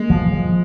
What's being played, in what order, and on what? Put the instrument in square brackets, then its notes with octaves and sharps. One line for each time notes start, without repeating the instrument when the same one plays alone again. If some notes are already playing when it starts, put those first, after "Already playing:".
Already playing: [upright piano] G#3 [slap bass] A#3
[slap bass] F3
F3